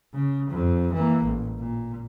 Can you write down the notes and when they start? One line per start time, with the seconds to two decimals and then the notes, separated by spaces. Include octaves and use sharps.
0.14 C#3
0.50 F2
0.93 E3 A#3
1.24 A1
1.59 A#2